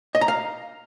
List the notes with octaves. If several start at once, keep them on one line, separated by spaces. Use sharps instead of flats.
D#5
A#5
F5